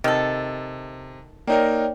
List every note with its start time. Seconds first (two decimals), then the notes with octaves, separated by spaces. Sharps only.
0.04 C3 D#3 A4
1.47 A#3 D#4 A#4 C#5 D5 G5